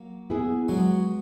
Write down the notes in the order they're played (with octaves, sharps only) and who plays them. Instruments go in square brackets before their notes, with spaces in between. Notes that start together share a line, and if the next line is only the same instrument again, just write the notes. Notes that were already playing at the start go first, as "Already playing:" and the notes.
Already playing: [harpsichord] F#3 A#3
[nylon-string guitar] B3 E4 G#4
[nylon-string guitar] F#3 [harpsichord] G#3 B3